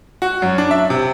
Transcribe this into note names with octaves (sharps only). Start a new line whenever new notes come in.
F#4
F#2
D4
E5
C3